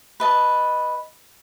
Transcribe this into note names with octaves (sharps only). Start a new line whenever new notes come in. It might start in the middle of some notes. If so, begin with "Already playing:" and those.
B4 D#5 A5